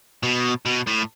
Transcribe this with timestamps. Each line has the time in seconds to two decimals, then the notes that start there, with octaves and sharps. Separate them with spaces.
0.23 B2
0.66 B2
0.87 A2